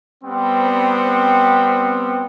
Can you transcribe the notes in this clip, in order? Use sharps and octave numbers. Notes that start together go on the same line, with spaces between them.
G3 B3 C4